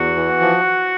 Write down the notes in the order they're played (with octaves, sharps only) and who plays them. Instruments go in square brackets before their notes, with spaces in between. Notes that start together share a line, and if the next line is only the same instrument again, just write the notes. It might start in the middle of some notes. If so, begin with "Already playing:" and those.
Already playing: [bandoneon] E2 F#4 F#5
E3
F3